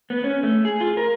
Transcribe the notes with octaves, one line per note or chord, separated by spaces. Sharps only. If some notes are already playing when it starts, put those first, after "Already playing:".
B3
C#4
A3
G#4
F4
A#4